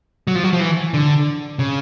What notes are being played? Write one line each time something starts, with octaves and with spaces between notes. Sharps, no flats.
F#3
F3
F#3
F3
E3
D3
C#3